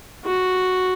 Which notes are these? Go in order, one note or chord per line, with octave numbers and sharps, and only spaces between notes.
F#4